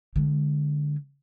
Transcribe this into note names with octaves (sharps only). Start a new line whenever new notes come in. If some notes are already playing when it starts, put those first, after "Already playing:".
D3 G#3